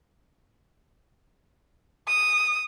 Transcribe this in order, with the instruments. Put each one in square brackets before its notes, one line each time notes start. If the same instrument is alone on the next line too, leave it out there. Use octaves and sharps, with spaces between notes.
[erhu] D#6